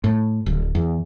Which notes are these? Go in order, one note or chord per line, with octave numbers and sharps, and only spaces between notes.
A2
D1
E2